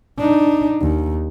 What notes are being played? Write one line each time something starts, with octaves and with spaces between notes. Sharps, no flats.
D4 D#4
D#2